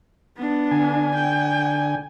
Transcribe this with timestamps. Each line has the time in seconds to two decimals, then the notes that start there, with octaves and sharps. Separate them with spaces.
0.37 B3 D4
0.71 D3 G#5
1.15 G5